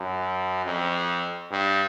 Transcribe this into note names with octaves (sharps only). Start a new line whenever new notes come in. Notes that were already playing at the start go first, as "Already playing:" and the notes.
Already playing: F#2
F2
G2